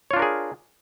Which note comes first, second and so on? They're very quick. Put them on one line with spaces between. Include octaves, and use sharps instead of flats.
C#5 F4 D4 A#4 G#4